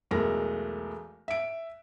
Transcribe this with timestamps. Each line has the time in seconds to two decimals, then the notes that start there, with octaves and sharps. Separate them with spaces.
0.11 B1 E2 G#3 A3 A#4 A#6
1.28 E5 D7